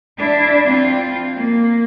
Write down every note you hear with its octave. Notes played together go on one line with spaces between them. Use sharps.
D4 E4
C4 F4
A#3